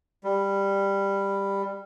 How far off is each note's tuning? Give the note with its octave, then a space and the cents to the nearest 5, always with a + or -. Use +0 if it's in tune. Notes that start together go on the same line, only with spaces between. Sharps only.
G3 +10